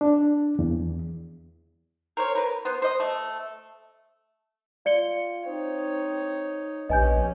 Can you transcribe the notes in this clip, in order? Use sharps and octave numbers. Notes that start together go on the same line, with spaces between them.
D4
E2
A#4 C5 C#5
A#4 B4
B3 C5
C5 D#5
A3
F4 D5 C#7 G7
C4 D#4 C#5
A#1 B3 C#4 G4 D#5 G#5 G6